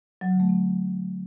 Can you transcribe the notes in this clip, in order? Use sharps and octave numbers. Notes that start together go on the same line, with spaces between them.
F#3
D3
A3
C4